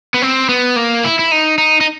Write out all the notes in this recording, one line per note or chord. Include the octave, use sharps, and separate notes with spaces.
B3
C4
B3
A#3
E4
E4
D#4
D#4
D#4